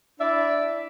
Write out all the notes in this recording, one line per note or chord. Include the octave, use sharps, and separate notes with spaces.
D4 E4 D5 E5